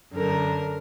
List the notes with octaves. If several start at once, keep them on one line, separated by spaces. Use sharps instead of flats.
F#2 D3 A#4